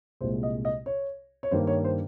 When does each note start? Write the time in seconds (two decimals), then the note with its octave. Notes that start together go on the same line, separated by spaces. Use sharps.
0.21 C2 A#2 G#3 C5
0.43 D#5
0.65 D#5
0.86 C#5
1.43 C#5
1.51 G2 D#3 A#3 C5
1.67 C#5
1.84 C5